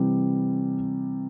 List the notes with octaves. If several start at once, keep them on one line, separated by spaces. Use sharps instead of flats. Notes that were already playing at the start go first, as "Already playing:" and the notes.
Already playing: C3 E3 G3